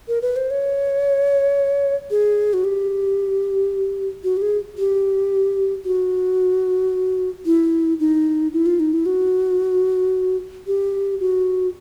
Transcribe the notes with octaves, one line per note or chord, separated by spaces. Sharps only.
A#4
B4
C5
C#5
G#4
F#4
G4
F#4
G4
G#4
G4
F#4
E4
D#4
E4
F4
D#4
E4
F#4
G4
F#4